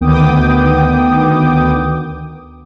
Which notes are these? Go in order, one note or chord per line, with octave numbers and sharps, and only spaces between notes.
D2 D#3 B3 G5 D6 D#6